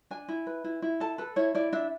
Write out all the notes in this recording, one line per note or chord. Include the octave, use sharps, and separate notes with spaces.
D4 G#5
E4
B4
E4
E4
A4 A5
A4 B4
E4 C#5
E4 D5
D4 E5